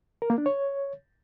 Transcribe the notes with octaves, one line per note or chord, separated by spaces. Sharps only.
A#4
A#3
D4
C#5